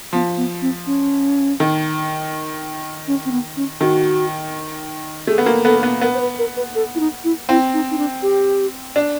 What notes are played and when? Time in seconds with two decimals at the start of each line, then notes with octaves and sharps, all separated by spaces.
0.13 F3 B3
0.37 B3
0.62 C4
0.86 C#4
1.60 D#3
3.07 C#4
3.25 C4
3.31 B3
3.56 C#4
3.81 D#3 F#4
5.27 A3 G#4
5.38 B3
5.46 A#3
5.65 B3 A4
5.83 B3
6.01 B3 A#4
6.14 C5
6.20 B4
6.38 A#4
6.56 B4
6.75 A4
6.95 E4
7.00 D#4
7.24 E4
7.49 C4 E4
7.73 D#4
7.90 D#4
7.98 D4
8.22 G4
8.96 D4